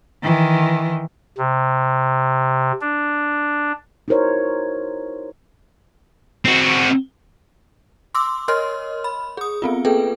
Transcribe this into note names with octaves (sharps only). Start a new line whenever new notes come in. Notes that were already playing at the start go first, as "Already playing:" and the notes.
D#3 E3
C3
D4
D#4 E4 F#4 A#4 C5 C#5
C4 F#4
C6 D6 E6
A#4 C#5 D#5 C6 F6
B5
G#4 D#6
B3 C4 F4
A#3 G#4 A4 B4 G5